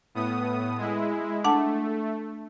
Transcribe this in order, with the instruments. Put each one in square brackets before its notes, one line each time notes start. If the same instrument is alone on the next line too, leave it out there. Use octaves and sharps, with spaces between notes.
[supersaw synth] A2 B3 D#6
G#3 E4
[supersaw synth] A3 [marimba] D4 F#5 A5